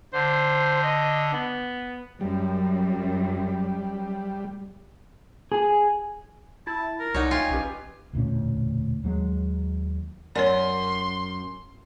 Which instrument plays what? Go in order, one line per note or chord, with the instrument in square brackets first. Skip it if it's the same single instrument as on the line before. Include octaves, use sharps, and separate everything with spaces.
[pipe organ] D3 [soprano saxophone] C5
[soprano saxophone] D#5
B3
[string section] F#2 [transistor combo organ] G3
[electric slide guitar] G#4
[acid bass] E4 [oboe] A5
[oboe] A#4
[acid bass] C2 [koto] D#4 C#5 [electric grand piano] F#4 D5 F#5
[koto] F4 [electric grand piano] G5 [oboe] G#5
[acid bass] A#1 [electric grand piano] C#4 G4 B4
[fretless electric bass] E1 D2 A#2 C#4
D#2 F#3 G#3
[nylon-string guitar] F#2 [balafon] C#5 D5 [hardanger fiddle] C6